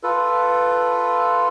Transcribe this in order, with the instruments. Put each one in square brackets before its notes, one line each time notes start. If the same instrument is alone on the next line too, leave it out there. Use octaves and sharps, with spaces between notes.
[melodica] F4 A4 B4